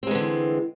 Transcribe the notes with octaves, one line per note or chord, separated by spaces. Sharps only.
D3 E3 G#3 C4